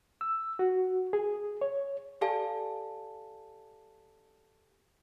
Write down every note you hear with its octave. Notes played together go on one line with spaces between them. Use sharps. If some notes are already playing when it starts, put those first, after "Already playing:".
E6
F#4
G#4
C#5
G4 A4 D5 F5 G#5 A5